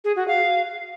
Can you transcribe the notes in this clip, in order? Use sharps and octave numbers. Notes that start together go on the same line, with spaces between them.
G#4
F#4
F5